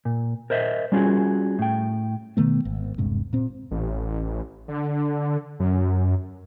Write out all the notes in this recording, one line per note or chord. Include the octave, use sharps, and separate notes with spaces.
A#2
A#4 C5 D#5 E5
G3 C#4 F4 F#4 G#4
A2 G5
B2 D#3 A3 B3
G#1
D#1 G2 C3 G#3
A#2 C4
A1
D3
F#2